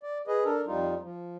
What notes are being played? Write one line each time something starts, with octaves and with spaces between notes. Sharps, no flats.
D5
G#4 B4 D#5
D4 A4 A#4
F2 G3 D#4 F4
F3